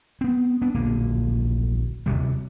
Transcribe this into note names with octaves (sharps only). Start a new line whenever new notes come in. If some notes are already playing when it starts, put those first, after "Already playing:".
B3 C4
B3 D4
D1 A#1 D3 A#3
D1 G1 C3 G3